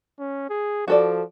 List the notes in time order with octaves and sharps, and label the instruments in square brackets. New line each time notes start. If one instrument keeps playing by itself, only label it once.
[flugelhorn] C#4
G#4
[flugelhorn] F3 [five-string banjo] F#4 A4 D5